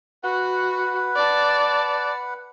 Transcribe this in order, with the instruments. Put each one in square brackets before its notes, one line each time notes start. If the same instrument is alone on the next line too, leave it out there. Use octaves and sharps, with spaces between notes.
[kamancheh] F#4 [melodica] B4 F#5
[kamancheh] D5 A5